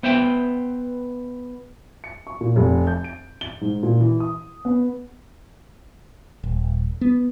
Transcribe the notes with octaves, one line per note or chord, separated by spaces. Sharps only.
B3 C5 E5 G5
C#7
C#6
A#2
F1
G6
D7
G7
G#2
A#2
E3
D#6
B3
D#1
B3